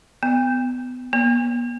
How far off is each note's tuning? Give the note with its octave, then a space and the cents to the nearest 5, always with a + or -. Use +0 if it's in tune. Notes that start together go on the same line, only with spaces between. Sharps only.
B3 +25
B3 -45